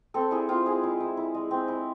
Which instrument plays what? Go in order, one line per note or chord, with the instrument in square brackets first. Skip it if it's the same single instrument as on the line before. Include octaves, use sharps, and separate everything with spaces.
[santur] C4 A4
E4 G#4
C4 F4
G#3 G#4
E4
E4
E4
G#3
C4
E4